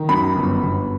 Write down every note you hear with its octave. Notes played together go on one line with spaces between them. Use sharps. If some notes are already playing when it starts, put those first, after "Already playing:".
Already playing: D#3
F#2 B5
G1
G1